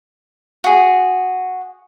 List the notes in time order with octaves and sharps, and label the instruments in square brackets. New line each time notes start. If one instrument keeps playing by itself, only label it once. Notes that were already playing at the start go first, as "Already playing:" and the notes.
[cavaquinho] F#4 G#4